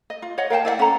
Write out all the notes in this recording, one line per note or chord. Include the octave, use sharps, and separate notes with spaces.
D#5
F4
C#5 D#5 F#5
A#4 F5 G5 A5
E4 D5 E5 F#5
C#4 A4 F#5 A#5